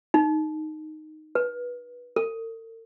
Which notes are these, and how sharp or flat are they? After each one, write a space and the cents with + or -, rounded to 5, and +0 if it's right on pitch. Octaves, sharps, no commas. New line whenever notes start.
D#4 -5
B4 -20
A4 +45